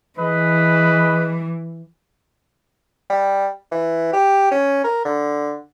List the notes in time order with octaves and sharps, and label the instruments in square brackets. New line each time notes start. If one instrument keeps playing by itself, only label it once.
[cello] E3 [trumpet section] G#4 B4 D#5
[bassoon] G3
E3
G4
C#4
A#4
D3